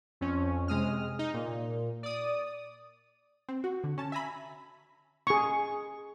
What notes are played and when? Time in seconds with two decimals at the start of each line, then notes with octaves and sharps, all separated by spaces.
0.21 F2 C#4
0.68 C3 G#3 D#6 F6
1.19 D#4
1.34 A#2
2.03 D5 D#6
3.49 C4
3.64 F#4
3.84 D3
3.98 C#4 A5
4.12 E5 G#5 A#5 B5
5.27 G#4 C#6